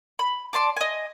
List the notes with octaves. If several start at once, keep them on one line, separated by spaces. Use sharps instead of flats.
B5
D5 A5 C6 D6
D#5 G#5